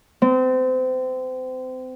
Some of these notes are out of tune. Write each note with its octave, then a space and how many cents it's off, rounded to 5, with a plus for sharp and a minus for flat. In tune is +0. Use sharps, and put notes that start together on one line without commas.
C4 -30